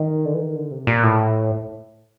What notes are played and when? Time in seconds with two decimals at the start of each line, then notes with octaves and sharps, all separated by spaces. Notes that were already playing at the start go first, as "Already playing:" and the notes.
Already playing: D#3
0.25 D3
0.34 E3
0.41 D#3
0.56 D3
0.71 C3
0.87 A#2
1.03 A2